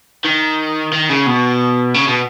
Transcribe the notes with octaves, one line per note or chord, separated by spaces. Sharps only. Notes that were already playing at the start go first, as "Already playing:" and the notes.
D#3
D#3
C#3
B2
C#3
B2